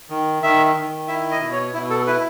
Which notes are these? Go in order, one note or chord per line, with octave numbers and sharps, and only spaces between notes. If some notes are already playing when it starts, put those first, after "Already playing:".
D#3
D#3 E5
D#3
E4 E5
D#5
B2
C#5
B2 E4
A4
E4 B4